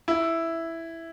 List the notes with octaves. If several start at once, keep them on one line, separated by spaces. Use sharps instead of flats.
E4